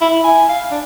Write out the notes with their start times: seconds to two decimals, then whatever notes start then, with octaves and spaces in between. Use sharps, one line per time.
0.01 E4
0.24 G#5
0.49 F5
0.71 D4